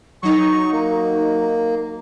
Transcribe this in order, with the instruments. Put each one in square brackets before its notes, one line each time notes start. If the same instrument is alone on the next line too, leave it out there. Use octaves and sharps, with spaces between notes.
[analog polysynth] F#3 D#4 [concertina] C#6
[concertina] A#3